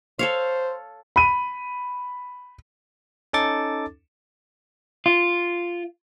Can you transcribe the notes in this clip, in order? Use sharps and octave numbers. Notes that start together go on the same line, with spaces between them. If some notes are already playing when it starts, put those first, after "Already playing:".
A4 C5 C#5 F5
B5 D#7
C#4 D#4 A4 D6 A6
F4